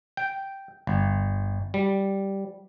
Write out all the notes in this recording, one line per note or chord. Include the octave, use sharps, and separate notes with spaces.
G5
G1
G3